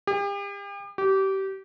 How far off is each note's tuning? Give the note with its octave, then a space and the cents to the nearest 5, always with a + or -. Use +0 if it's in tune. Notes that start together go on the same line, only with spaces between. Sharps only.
G4 +40
G4 -25